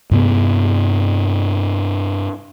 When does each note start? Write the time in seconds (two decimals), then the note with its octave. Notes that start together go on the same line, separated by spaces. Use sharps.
0.11 G2 C3 B3